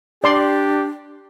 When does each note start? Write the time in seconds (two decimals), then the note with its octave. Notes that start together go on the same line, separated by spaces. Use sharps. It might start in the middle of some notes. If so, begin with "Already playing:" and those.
0.24 D4 G4 D5 C6